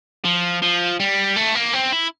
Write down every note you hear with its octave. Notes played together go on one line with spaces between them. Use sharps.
F3
F3
G3
A3
A#3
C4
E4